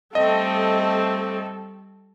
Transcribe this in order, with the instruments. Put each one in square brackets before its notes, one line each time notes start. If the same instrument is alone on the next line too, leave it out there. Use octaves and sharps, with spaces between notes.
[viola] G3 A4 [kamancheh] A3 C4 [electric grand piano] D#5